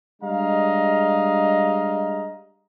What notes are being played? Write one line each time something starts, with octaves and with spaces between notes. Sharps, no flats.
G3 G#3 D4 D#5 F5 A#5